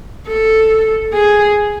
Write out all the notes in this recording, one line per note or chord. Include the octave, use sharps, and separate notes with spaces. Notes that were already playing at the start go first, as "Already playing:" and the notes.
A4
G#4